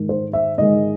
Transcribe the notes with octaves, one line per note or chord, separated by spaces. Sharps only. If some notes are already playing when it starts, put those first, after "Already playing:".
Already playing: G#2 D#3 G#3
C5
E5
G#2 D#3 G#3 D#5